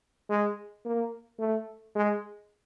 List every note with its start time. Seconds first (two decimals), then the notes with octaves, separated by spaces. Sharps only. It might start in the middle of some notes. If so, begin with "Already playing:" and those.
0.29 G#3
0.86 A#3
1.39 A3
1.95 G#3